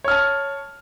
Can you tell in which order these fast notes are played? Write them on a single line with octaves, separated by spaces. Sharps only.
C#5 F6 A5